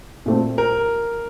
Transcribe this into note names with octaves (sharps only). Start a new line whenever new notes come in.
A#2 A3 C4
A#4